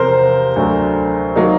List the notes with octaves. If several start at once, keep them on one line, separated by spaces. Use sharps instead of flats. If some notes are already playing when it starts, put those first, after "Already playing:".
Already playing: E2 C3 F3 A#4 C5
D2 D3 F#3 A3 D4
D#3 F#3 A#3 D#4